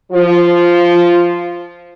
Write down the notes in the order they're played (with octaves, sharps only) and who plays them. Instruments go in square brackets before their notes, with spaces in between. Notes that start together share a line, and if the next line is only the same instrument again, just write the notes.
[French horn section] F3 F4